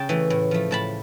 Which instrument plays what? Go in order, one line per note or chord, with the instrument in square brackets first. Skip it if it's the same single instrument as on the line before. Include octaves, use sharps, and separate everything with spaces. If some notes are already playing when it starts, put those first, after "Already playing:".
Already playing: [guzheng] C#3 G5 A5
E3 A3
A2
F3 A3
A2 A5 B5